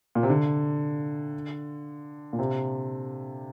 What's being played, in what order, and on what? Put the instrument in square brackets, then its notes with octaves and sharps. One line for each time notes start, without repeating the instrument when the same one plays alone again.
[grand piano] A#2
C3
D3
A#2
C3